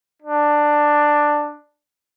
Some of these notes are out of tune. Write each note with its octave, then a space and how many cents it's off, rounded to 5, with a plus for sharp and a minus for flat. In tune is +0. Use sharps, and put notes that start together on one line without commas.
D4 +10